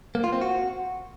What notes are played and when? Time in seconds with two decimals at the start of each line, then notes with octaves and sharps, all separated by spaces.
0.15 A#3
0.24 F4
0.33 C4
0.41 F#4